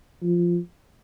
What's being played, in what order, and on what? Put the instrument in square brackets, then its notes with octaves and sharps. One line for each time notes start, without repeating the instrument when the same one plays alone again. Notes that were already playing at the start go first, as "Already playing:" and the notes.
[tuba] F3